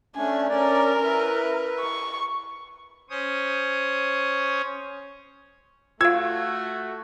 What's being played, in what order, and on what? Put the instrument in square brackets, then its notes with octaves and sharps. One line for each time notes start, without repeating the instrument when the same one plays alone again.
[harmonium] A3 C#4 D4 [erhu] G#5
[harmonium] C#4 D5 [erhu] A#4
[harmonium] E4 B4
[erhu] C#6
[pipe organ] C#4 C5 C#5 D#6
[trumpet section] A3 F#4 [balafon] F4 F5 [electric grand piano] E6 G#6